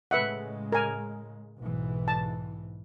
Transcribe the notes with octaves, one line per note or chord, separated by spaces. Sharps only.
A2 C#3 G#3 B4 E5 F#5
A#4 G#5
B1 G#2 E3
A5